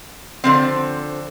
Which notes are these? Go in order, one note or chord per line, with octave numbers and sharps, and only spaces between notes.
D3 F3 C4